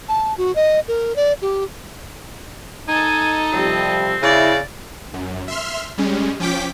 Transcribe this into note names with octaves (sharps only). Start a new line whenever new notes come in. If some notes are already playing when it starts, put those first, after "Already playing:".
A5
F#4
D#5
A#4
D5
G4
D#4 A4 D#5 G#5
C3 F3 G3 C4
C#3 E4 D5
F#2
E5 C6 F6
G3 G#3 C#4
F3 C#4 G5 D6 B6